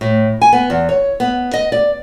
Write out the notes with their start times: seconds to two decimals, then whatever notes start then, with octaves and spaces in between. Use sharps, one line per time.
0.01 A2
0.42 G#5
0.53 B3
0.70 E2
0.89 C#5
1.20 B3
1.53 D#5
1.72 D5